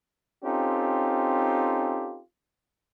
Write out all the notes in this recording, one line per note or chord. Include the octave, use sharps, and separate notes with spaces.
C4 C#4 D#4 F4 G4 A4